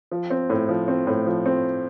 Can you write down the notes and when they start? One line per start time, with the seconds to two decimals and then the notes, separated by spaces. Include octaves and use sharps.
0.12 F3
0.30 C4
0.50 A2
0.69 F3
0.88 C4
1.07 A2
1.26 F3
1.46 C4